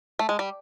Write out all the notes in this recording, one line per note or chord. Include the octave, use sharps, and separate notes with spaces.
A3
G#3
G3